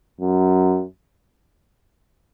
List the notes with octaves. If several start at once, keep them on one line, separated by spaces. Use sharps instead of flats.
F#2